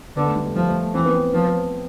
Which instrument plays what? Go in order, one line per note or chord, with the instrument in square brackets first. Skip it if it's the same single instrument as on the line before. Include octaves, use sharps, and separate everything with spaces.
[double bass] D3 [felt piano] B3
[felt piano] A3
G3
A3
[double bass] F3 [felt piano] G3
[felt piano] A3
[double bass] E3 [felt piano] C4
[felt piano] B3
C4
[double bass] F3 [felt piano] B3